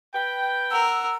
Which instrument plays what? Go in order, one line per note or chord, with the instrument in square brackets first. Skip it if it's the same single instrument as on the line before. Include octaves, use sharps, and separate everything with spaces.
[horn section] B4 G5
[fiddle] A#4 [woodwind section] F#5 E6